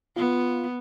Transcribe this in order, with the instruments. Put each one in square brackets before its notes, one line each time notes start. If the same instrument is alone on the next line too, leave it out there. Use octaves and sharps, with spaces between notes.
[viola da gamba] B3 [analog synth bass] F4